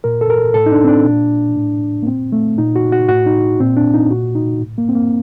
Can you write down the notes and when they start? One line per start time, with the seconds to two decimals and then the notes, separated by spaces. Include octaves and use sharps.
0.04 A#2 A#4
0.21 A4
0.30 A#4
0.54 A2 A4
0.66 D#4
0.72 D4
0.84 C4
0.88 D4
1.05 A#2
1.57 A2
2.03 A#3
2.07 A#2 C4
2.32 A3
2.58 A#2 D#4
2.76 F#4
2.92 F#4
3.08 A2 F#4
3.26 D#4
3.60 A#2 C4
3.77 D4
3.94 D#4
4.11 A#2 F#4
4.35 D#4
4.61 A2
4.78 A#3
4.89 C4
4.95 A#3